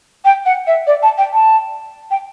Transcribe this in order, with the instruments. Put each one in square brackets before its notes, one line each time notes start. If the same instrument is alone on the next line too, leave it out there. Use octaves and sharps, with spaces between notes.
[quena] G5
F#5
E5
D5
A5
G5
A5
G5